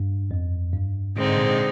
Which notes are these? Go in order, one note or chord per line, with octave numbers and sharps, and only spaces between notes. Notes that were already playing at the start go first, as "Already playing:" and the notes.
Already playing: G2
F2
G2
G#2 D3 G#3 C4 D#4
A#2